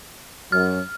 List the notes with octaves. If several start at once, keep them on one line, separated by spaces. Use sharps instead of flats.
F#2 F6